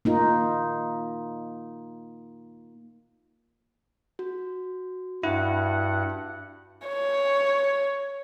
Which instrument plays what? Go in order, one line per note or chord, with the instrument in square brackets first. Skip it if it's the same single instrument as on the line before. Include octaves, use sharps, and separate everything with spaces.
[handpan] A#3 D#4 F4
[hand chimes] F#4
[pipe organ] G2 F#5 [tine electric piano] E4
[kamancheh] C#5